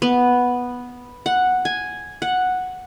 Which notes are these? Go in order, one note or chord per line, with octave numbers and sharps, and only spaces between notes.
B3
F#5
G#5
F#5